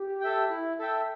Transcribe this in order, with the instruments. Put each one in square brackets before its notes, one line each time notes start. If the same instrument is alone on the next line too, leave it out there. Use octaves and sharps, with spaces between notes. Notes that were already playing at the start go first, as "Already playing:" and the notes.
Already playing: [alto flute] G4
[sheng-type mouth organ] A4 E5 G5
E4
A4 E5 G5